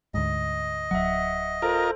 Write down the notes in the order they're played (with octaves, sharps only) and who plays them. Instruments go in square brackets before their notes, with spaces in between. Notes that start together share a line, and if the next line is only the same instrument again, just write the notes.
[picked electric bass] D2 G#2 [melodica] D#5
[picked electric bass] D1 A#1 F#3 [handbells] E5 F#5
[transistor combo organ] F4 A#4 [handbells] A4 C5